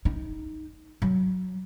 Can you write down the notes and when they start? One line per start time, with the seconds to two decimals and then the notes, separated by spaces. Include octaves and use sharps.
0.05 D#4
1.02 F#3